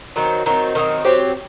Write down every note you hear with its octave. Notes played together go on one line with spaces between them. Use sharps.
D#3 F#3 C4 D#4
D#3 F#3 C4 D#4
D#3 F#3 C4 D#4
F#3 C4 G4